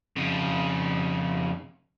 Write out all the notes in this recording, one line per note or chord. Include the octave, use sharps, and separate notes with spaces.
F2 C#3